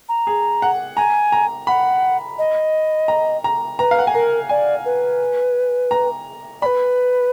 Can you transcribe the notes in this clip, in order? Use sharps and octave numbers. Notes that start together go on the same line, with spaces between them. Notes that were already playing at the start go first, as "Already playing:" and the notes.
A#5
G#4
F#5
G#5 A#5
A#5
F#5 B5
D#5
A#5
A#5
B4 A#5
F5
F#5
G#5
A#4 A#5
D5 G#5
B4
A#5
B4 D5 B5